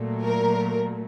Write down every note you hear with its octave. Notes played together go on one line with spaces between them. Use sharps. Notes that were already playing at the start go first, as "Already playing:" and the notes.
Already playing: A#2 F#3 A3
A#4